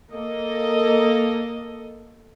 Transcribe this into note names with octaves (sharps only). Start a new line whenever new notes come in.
A#3 A4 D#5